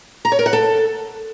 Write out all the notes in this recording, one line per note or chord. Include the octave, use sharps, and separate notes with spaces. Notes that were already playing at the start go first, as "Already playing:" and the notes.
A#5
C#5
A#4
F#5
A4